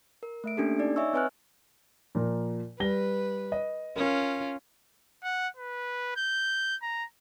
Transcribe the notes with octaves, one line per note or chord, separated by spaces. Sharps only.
A#4
A3 E5 D7
A#3 C#4 D4 G4 A4
D#4 D5
C#5 D#5 E5 G#5 C#6 E6
C4 B4 C#5 G#5 F6 F#6
A#2 F3 A#4
G3 B4 A#6 G7
D#5
C#4 F4 A#4
F#5
B4
G6
A#5